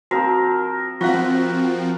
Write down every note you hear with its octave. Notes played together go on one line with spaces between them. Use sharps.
F3 C4 F#4 A#4
F3 C4 F4 F#4 F5 F#5